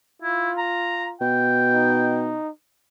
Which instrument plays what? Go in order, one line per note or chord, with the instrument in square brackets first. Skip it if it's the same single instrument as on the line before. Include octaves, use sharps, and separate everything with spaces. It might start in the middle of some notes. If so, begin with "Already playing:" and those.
[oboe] E4 [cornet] F4
[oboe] A#5
[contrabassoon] B2 [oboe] G5
[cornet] D#4